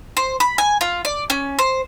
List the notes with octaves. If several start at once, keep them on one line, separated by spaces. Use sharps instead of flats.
C5
B5
G#5
F4
D5
C#4
C5